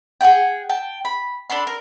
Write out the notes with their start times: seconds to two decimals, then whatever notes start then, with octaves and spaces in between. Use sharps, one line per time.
0.21 G#4 A4 F#5 G5
0.69 G5 A5
1.05 B5
1.50 D4 A4 B5 C6
1.67 A#4